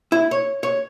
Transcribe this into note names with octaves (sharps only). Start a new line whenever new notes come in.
E4
C#5
C#5